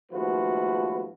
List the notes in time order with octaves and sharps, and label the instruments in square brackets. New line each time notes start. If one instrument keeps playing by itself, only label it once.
[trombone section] G#1 D#2 F3 A3 F#4 B4